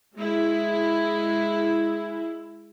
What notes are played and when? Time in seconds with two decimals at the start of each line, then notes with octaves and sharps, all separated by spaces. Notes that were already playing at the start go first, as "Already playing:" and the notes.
0.17 G#3 E4